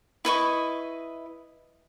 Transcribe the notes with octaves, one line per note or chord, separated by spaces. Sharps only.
E4 B4 D#5 C#6